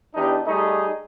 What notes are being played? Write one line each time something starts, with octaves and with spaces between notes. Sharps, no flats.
E2 D4 D#4 G4
G3 A3 D#4 G#4